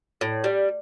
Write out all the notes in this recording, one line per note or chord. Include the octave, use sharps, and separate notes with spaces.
A2
G3